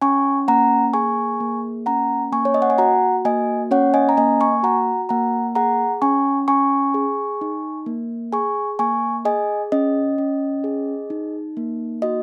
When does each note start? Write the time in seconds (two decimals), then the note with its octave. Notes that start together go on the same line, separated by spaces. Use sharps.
0.02 C#4 G#5 C#6
0.48 A#3 F#5 A#5
0.94 G#4 G#5 C#6
1.40 A#3
1.86 C#4 F#5 A#5
2.32 A#3 G#5 C#6
2.45 C#5
2.54 D#5
2.62 F#5
2.70 G#5
2.78 F#4 F#5 A#5
3.25 A#3 D#5 G#5
3.71 C#4 C#5 F#5
3.94 D#5 G#5
4.09 A#5
4.17 A#3 D#5 G#5
4.41 G#5 C#6
4.63 F#4 F#5 A#5
5.09 A#3 F#5 A#5
5.55 G#4 F#5 A#5
6.02 C#4 G#5 C#6
6.48 C#4 G#5 C#6
6.94 G#4
7.41 D#4
7.86 A#3
8.33 G#4 G#5 C#6
8.79 A#3 G#5 C#6
9.25 G#4 D#5 G#5
9.72 C#4 D#5
10.18 C#4
10.64 G#4
11.10 D#4
11.57 A#3
12.02 F#4 D#5